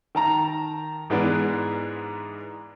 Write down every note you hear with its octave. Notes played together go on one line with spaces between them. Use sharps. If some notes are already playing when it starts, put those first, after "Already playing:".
D#3 A5 A#5
G#2 E3 G#3 B3 D4